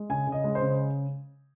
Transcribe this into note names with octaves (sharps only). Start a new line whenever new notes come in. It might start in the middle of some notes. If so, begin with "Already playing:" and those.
Already playing: G#3
C#3 G#5
C#3
D#5
G#3
C5
C#3